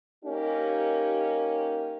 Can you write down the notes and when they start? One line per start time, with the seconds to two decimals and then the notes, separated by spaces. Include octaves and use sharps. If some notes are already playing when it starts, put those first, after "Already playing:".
0.24 A#3 C#4 D#4 G4